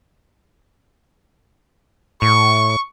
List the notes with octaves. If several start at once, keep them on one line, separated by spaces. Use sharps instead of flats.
A2 C#6